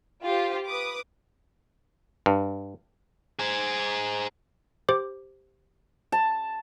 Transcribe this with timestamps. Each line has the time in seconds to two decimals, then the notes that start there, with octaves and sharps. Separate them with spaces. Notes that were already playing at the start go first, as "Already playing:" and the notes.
0.24 F4 G4 C5
0.65 B4 D6 D#6
2.26 G2
3.39 G#4 C5
4.89 G4 C5 D6
6.12 A5